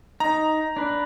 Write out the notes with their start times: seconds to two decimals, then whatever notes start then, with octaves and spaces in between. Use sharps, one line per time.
0.20 D#4 A#5
0.76 D4 B4